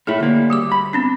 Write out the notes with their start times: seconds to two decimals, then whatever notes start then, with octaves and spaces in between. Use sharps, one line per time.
0.07 A2 A3 E4 G#4 C#5
0.20 D2 A#3
0.50 G3 G4 D6
0.72 B5
0.93 B3 C4 D4